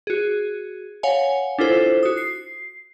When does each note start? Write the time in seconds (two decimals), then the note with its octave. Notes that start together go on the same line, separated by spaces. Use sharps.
0.07 F#4 G#4
1.03 C#5 F5 F#5 G#5
1.58 D4 E4 F4 A4 C5
2.03 F#4 D#6
2.17 C7